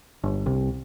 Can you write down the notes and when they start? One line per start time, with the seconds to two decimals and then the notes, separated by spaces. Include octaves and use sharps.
0.23 G1
0.46 C2